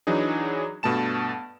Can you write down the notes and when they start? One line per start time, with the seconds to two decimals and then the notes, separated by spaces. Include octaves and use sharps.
0.07 E3 F#3 D4 D#4 G#4
0.83 G2 B2 A3 A5 E7